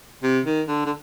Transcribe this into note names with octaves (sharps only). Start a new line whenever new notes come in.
C3
D#3
D3
D3